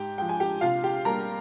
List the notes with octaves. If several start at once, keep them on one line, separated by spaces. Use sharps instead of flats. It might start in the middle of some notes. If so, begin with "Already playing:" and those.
Already playing: G#2 G4 G5
F3 G#3 G5
G#5
G4 G5
C3 F4 F5
G4 G5
G3 A#3 A#4 A#5